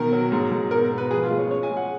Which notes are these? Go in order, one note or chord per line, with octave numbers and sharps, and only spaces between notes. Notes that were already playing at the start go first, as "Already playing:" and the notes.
Already playing: B2 D#3 A#4
F#3
G#2
G#2
B2 A#4
B2
B4
F3 G#4
F4
G#3
C#5
C#4 C#5
G#5
G#3
F#5